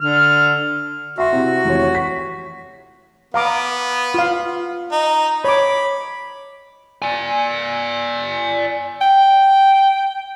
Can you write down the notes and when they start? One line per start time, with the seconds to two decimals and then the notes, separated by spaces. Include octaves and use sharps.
0.01 D3 F6
1.18 F#4 E5 C6
1.32 C3 C4 E4
1.65 F1 E3 C#5
1.95 B6
3.34 B3 F5 A#5 D6
4.14 F4 F5
4.92 D#4
5.44 C#5 B5 D6
7.02 D5 G#5
9.01 G5